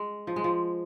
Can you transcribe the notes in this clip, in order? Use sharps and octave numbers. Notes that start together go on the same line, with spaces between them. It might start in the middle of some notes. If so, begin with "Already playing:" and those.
Already playing: G#3
F3
G#3
F3